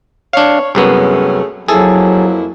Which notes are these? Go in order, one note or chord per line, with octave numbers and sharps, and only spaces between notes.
D4 C#5 F5
C2 F#2 A3 B3 C#4 G#4
F2 F#3 A#3 E4 G#4 A4